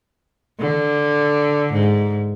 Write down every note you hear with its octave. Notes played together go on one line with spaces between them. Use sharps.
D3
G#2